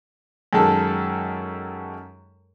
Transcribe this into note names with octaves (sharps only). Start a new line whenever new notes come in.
F#2 D#3 G#3 A4 A5